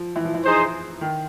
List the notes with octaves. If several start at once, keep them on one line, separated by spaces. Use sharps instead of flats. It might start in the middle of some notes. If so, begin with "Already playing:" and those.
Already playing: F3
E3
F3
E3
D#4 G#4 C5
D#3